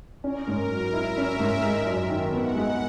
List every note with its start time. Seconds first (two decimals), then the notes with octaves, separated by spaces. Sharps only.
0.24 C#4 A#4
0.48 G#2
0.71 F#3
0.93 E4 E5
1.17 C#4
1.39 G#2
1.63 G#3
1.85 F#2
2.09 D#3
2.32 B3 F#5
2.55 G#3